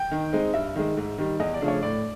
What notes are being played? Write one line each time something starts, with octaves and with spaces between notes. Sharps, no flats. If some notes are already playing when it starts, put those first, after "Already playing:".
Already playing: G5
D#3
G#3 C4 D#4
G2 E5
D#3 G#3
G#2
D#3 G3
E2 D#5
D5
C#3 F3 A3 D4
C#5
A2 D5